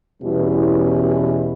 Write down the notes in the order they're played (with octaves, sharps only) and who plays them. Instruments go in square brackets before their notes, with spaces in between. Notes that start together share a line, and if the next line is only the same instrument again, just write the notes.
[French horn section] E2 B2 G3 C#4 E4 G4